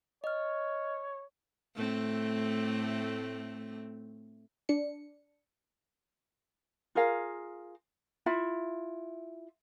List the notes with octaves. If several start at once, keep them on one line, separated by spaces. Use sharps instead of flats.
C#5 D#5 F6
A2 A3 C4
D4 C#7
F4 G#4 A#4 F5
E4 F4 E5 B5